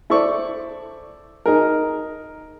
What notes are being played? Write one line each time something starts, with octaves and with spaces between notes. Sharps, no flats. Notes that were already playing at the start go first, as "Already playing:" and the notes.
E4 A4 C5 D5 C#6
D#4 G#4 A#4